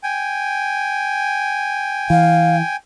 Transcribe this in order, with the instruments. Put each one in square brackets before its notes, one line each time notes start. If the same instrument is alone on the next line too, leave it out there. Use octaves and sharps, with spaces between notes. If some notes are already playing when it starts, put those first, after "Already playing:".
[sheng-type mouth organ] G5 G#5
[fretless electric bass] E3 [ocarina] F5